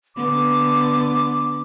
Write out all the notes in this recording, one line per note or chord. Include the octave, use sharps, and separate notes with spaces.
D3 B3 D6